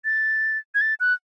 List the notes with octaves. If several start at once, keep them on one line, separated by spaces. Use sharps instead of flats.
A6
G#6
A6
F#6